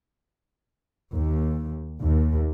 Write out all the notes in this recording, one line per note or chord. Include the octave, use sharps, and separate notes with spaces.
D#2
D#2